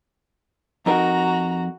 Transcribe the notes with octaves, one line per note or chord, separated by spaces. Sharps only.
F2 D#4 F#4 A#4 A#5